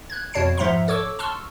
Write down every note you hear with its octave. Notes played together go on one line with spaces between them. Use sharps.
F#6 G#6
F2 B2 C#5 A5 C7 D7
G#2 F3 E5 F#5 A#5 C6
A4 C#5 C#6 D6 E6
A5 C6 C#6 E6 F6